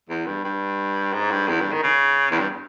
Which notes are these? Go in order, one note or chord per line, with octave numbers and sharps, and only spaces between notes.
E2
G2
G2
G#2
G2
E2
G2
D#3
C#3
E2
G2